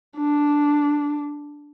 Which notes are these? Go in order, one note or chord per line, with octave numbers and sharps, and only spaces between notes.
D4